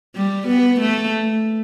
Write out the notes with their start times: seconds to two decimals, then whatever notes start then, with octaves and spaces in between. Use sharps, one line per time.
0.16 G3
0.47 B3
0.80 A3